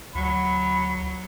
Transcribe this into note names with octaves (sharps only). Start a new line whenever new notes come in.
D2 F#3 B5